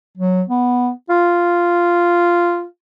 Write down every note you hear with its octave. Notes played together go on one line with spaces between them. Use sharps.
F#3
B3
F4